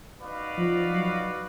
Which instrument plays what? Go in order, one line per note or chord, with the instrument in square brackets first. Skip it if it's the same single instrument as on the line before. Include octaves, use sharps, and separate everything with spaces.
[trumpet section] D#4 F#4 B4 D5 F5
[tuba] F3
F#3